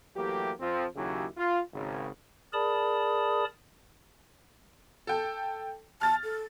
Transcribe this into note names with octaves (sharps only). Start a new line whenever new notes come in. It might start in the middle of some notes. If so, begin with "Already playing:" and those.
E3 F#3 A3 A#3 G4
F2 F3 C4
D#2 C#3 F#3 E4 G4 G#4
F4
G#1 C#3
G#4 A#4 D5 A5 B5 D#6
A4 G5
A5 F6 A6
A4